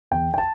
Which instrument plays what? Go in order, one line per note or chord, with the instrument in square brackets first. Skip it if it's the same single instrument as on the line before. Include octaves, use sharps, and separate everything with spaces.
[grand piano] E2 G5
G5
A5